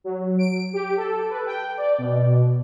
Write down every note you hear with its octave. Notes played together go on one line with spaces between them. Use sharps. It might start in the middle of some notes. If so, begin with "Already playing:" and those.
F#3
D7
G4
A4
B4
G5
D5
B2